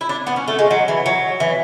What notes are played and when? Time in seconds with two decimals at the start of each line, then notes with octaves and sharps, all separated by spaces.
0.01 E4
0.09 D4
0.27 B3
0.36 C#4
0.48 A3
0.59 G#3
0.71 F#3
0.88 E3
1.06 F#3
1.40 E3